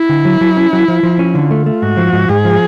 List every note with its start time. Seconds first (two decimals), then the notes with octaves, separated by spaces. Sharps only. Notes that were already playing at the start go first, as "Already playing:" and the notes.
Already playing: E4
0.09 D3
0.25 F#3
0.41 F#3
0.57 C#4
0.73 F#3
0.88 F3
1.03 F3
1.19 C#4
1.35 D3 F4
1.51 A3
1.66 A3
1.82 G#2 F#4
1.97 F3
2.13 G#2
2.29 G#2 G#4
2.45 F3